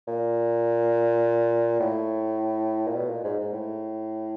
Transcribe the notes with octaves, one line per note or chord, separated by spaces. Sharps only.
A#2
A2
A#2
B2
A#2
G#2
G#2
A2